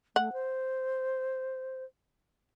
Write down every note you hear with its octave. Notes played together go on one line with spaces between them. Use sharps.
A3 F#5
C5